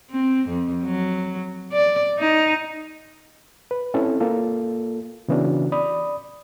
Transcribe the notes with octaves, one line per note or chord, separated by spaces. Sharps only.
C4
F2
F#3
D5
D#4
B4
C4 C#4 E4 A4
A#3 F4 A4
C#3 E3 B3 C#4 D4 F#4
D5 B5 D#6